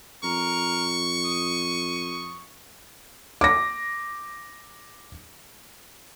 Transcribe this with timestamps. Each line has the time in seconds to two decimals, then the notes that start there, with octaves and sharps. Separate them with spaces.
0.23 F2 A#4 C#6
1.25 D#6
3.41 D6 A#6